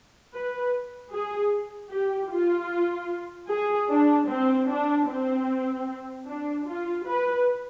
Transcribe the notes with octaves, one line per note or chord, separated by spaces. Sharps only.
B4
G#4
G4
F4
G#4
D4
C4
D4
C4
D4
F4
B4